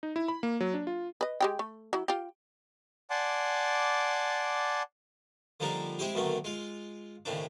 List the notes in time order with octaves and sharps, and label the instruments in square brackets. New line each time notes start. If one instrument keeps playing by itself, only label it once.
[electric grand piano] D#4
E4
B5
A#3
F#3
D4
F4
[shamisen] B4 D#5
G#3 G4 G5
A3
F#3 E4
F4 G4
[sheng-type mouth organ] D5 F#5 G#5 A5 C6 D6
[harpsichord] D3 F3 G3 A#3 D4 D#4
G#3 C4 E4 G4 G#4
B1 F#2 D3 D#3 A3 A#3
G#3 F4
D#2 A2 C#3 C4 D4